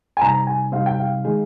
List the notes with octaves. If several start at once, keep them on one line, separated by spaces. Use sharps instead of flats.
G#5
C3 G3 C4 D#4 A#5
G#5
C3 G3 C4 D#4 F5
G5
F5
D#3 G#3 D#4 G#4